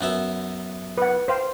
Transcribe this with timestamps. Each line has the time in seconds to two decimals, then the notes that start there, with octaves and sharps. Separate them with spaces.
0.01 F#2 B3 E5
0.98 B4 F#5
1.28 C5 F5 G5